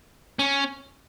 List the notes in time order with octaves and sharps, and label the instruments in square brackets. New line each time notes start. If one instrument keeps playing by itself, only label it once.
[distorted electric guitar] C#4